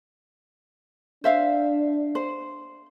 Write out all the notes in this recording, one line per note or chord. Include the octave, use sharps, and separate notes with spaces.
D4 C5 E5 F5
C5